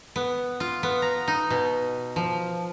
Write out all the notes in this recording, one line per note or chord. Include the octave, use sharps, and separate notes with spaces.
B3
F4
B3
A#5
D#4
B2
F3